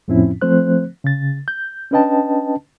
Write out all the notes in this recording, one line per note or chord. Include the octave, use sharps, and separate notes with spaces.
F2 A2 F3 C4 C#4 E4
F3 A3 C4 C5 F#6
C#3 A6
G6
C#4 D4 B4 D#5 G5 A5